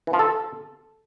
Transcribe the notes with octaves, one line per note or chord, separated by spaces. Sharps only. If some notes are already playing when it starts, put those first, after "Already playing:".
E3
F3
A4